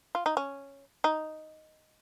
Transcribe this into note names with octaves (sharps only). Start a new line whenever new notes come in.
F4
D#4
C#4
D#4